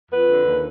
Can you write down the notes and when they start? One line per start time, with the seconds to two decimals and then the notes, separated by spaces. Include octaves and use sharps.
0.11 F2 B4
0.28 D3
0.44 D#2